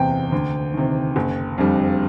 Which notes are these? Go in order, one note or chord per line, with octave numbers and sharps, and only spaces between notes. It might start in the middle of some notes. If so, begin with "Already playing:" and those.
Already playing: F#1 E2 C3 G5
D2
C3 D#3
F#1
F2 D3 G3